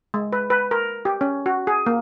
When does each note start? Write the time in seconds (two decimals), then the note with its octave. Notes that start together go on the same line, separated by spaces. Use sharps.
0.14 G#3
0.33 B4
0.50 B4
0.71 A#4
1.05 G4
1.21 C#4
1.46 F#4
1.67 G#4
1.86 A#3